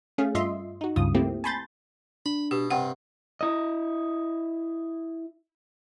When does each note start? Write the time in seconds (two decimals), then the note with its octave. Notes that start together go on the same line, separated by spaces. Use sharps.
0.18 A3 C#4 G#4 F5
0.35 G2 F4 D#5 E5 C6
0.81 D#4 F#4
0.96 C#2 G2 C#3 F4 D#6
1.14 A3 A#3 C4 E4 G4
1.44 G#5 A5 B5 C6 G6 A6
2.26 D4 B5
2.51 B2 G4
2.71 G2 C3 F#5
3.41 E4 D#5